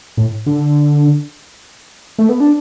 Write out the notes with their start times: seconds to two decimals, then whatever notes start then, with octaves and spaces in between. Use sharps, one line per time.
0.17 A2
0.46 D3
2.19 A3
2.29 B3
2.40 D4